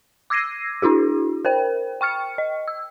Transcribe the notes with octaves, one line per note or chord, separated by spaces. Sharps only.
D6 E6 G#6 A#6 C7 D#7
D4 E4 F#4 G#4
A#4 C5 G5
G5 C#6 F6 C#7
D#5
E6